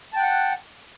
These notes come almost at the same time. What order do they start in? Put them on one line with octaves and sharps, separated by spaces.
A5 G5 F#6 F#5